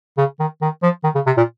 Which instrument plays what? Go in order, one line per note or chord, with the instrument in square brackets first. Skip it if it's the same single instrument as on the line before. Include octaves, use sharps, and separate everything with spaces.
[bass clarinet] C#3
D#3
D#3
F3
D#3
C#3
C3
A#2